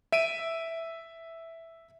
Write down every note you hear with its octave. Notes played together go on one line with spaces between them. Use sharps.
E5 D7 D#7